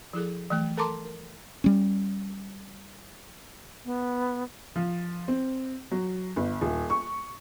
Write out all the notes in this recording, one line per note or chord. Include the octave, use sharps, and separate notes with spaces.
F3 E4 G#4 A4
E3 F#3 A3 G5
A4 A#4 A5 A#5 C6 D6
A#4
G3 C#4
B3
F3
C4
F#3
G1
D#1
C#6